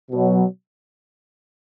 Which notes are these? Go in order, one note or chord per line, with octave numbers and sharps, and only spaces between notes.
B2 F#3